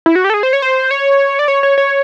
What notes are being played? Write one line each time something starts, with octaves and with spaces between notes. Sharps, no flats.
E4
F#4
G4
A4
G#4
C5
C#5
C5
C#5
D5
C#5
C#5
C#5